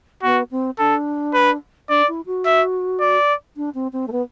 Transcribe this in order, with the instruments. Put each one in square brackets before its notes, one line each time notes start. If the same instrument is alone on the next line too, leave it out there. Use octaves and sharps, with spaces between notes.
[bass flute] B3 [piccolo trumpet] F#4
[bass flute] C4
[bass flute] D4 [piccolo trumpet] A4
[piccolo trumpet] B4
[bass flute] D4 [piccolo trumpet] D5
[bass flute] E4
F#4
[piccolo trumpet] E5
D5
[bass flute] D4
C4
C4
A3
B3